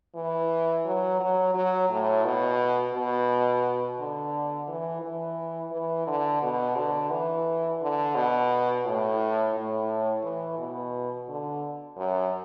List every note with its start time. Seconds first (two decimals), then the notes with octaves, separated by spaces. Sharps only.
0.15 E3
0.85 F#3
1.20 F#3
1.54 F#3
1.90 A2
2.25 B2
2.94 B2
3.99 D3
4.68 E3
5.02 E3
5.72 E3
6.07 D3
6.42 B2
6.76 D3
7.11 E3
7.81 D3
8.15 B2
8.85 A2
9.55 A2
10.23 E3
10.59 B2
11.29 D3
11.97 F#2